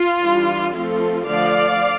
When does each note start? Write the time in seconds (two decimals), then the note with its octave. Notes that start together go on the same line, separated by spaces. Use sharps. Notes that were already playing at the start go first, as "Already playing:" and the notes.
Already playing: F4
0.23 E3 G3 D4
0.74 F3 A3 C4 F4 A4
1.26 D3 F3 A3 D5 F5